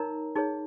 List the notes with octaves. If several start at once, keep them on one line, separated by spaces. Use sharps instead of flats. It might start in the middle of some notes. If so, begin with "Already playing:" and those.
Already playing: D#4 A#4 C#5 A#5
D#4 G#4 C#5